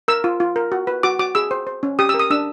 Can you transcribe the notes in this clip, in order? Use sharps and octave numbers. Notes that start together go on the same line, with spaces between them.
A#4 E6
F4
F4
A#4
F#4
B4
F#4 D6
F#4 D6
G#4 E6
C5
C5
C#4
G4 D#6
E6
A#4
D#6
D4 E6